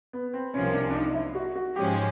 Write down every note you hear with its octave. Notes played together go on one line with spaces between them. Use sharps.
B3
C4
C2 C3 F3 A#3 C#4
D4
D4
D#4
E4
F#4
F#4
G#2 F3 G#3 C#4 G4